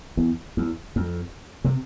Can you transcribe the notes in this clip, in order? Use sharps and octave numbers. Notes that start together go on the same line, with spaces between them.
E2
E2
F2
C3